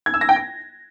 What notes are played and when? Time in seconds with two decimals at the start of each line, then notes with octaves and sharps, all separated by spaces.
0.06 G#6
0.14 E6
0.21 A#6
0.29 G5
0.36 A#6